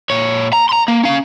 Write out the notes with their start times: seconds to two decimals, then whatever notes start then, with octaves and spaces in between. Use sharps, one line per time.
0.10 A#2 C#5
0.53 A#5
0.69 A#5 C6
0.88 A#3
1.03 C#4 F5